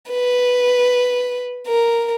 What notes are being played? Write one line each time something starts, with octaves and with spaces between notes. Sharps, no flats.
B4
A#4